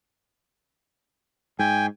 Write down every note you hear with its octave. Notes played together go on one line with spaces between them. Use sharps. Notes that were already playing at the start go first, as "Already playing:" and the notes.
G#2 G5 G#5